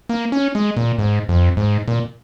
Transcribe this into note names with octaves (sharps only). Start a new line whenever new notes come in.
A#3
C#4
G#3
A#2
G#2
F2
G#2
A#2